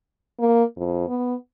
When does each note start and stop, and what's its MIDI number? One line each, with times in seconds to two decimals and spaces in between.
0.39 0.63 58
0.77 1.07 41
1.08 1.35 59